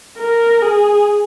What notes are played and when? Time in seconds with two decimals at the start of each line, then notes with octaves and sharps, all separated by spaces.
0.19 A#4
0.62 G#4